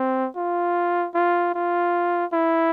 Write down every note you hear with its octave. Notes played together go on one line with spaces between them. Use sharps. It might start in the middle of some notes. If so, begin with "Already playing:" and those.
Already playing: C4
F4
F4
F4
E4